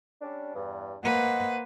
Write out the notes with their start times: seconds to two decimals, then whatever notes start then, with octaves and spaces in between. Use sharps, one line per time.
0.21 G3 C#4 D4
0.54 E2 G2
1.03 A#3 B4 C5 D#5 F#5